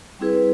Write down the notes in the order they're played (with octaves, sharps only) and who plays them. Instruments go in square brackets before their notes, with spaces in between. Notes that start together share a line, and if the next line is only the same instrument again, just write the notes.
[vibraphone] G3 C4 E4 G#4 B4